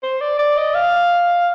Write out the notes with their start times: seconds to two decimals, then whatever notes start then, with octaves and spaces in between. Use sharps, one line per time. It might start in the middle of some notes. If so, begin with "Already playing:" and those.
0.03 C5
0.21 D5
0.39 D5
0.57 D#5
0.75 F5